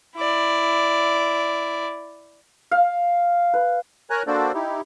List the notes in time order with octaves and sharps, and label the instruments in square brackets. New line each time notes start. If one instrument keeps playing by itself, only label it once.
[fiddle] E4 D5
[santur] F5
B4
[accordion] A#4 C#5 G#5 A#5 F#6
A#3 D4 F#4 A4 C5 D5
D#4 E4 G4